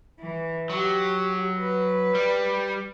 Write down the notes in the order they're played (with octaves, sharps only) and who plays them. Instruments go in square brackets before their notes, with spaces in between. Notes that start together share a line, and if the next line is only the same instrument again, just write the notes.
[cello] E3
[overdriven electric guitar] F#3 [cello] G4
[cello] B4
[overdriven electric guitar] G3